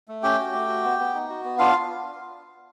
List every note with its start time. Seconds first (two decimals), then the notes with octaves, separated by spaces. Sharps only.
0.08 A3
0.23 C#4 G4 G5
0.39 F#4
0.54 A3
0.68 F#4
0.84 B3
0.99 B3
1.14 D#4
1.29 F#4
1.44 B3
1.59 D4 F4 F5